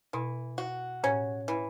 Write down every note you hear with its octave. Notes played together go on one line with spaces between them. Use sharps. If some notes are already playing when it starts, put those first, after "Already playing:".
B2 E3
F#4
A2 C#4
E3